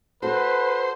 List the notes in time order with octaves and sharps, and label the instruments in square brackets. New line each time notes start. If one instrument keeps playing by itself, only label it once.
[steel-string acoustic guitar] F#4 A4 [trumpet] B4 [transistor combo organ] C5